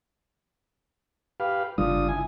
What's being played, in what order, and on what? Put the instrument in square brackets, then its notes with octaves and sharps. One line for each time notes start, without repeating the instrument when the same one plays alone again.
[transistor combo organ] G4 B4 F5
[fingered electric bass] G1 C#3 G3 [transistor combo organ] D4 F4 D#6
[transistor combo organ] E4 G#5